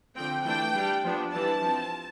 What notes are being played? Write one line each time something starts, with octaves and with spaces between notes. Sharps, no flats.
D3 F3 C4 G5
E3 A3 D4 G5
G3 D4
F3 B3 D4
E3 G3 D4 A5
F3 C4